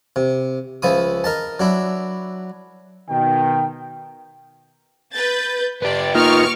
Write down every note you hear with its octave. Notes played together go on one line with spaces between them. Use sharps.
C3
C#2 F3 E4 D#6
A#4 D#5 A5
F#3 D4 E4
B2 D#3 G5
B4 G6 A6
B3 G4 D5
A#3 D#4 F4 C#6 D6 F6